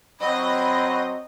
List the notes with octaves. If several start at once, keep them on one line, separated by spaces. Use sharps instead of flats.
F#3 C4 D#5 B5